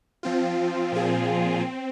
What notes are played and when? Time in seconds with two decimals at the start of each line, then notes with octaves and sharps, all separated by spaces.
0.23 F3 C4 F4
0.92 A#2 F3 C4 F4 G#4
1.60 C4